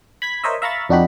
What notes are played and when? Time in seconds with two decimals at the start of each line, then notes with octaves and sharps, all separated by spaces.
0.22 B5 G#6 B6
0.44 A#4 C5 C#5 D#5 E5
0.62 E5 F5 A#5 B5 C#6 A6
0.89 F2 D4 D#4 F#4 G4 B5